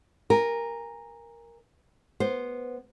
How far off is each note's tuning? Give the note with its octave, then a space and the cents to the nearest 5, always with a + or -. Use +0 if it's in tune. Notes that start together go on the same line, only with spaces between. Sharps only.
A#4 +0 G#5 -25
B3 -10 C5 +0